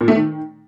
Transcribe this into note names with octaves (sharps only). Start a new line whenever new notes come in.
A#2
A3
D#3